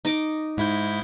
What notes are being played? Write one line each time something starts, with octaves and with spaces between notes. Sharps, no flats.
D#4 D#5 D6
G#2 E4 G6